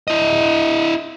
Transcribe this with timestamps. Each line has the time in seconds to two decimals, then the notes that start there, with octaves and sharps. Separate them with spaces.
0.08 E4 D#5